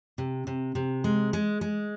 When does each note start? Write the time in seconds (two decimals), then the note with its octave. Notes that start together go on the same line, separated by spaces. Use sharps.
0.18 C3
0.47 C3
0.75 C3
1.04 G#3
1.33 G#3
1.61 G#3